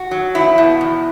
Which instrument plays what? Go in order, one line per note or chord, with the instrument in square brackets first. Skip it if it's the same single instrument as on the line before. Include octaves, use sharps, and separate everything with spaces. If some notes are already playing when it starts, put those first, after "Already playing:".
Already playing: [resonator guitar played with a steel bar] F#4
F#3
E2 E4
B2
E2